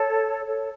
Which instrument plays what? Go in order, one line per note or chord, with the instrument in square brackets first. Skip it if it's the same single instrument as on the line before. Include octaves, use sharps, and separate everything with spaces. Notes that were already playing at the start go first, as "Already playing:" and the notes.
Already playing: [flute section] A4 C#5
A4 C#5